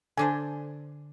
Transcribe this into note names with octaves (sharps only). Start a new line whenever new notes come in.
D3 D4 C5 G#5